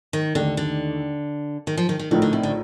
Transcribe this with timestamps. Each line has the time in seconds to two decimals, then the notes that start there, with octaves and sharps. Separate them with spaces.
0.13 D#3
0.35 D#2 D3 D#3 A3 D4 A4
0.57 D3
1.67 D#3
1.77 F3
1.89 D#3
1.99 D#3
2.11 A#1 A2 D3 A3 D#4 A#4
2.22 D3
2.33 C3
2.43 D3